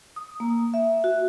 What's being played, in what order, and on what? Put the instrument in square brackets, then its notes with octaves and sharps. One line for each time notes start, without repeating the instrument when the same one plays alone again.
[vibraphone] D#6
A#3
E5
F#4